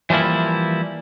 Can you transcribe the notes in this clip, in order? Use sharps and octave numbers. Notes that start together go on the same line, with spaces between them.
E3 F3 G3 A#3 E4